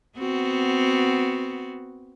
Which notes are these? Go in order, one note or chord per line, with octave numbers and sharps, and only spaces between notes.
B3 C4 F#4